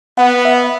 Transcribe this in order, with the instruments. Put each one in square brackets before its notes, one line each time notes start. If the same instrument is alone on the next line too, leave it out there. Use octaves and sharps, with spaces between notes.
[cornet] B3 [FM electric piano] F#5
[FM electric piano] E5